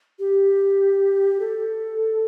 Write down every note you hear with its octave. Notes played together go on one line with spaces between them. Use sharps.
G4
A4